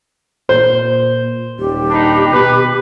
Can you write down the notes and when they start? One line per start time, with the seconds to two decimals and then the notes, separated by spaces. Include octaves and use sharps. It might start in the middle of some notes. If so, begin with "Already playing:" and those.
0.49 A#2 C5
1.59 D#1 G4
1.91 D4 D#4 B5
2.32 B2 B4